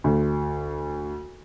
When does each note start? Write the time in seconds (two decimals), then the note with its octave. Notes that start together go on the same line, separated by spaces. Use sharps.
0.04 D2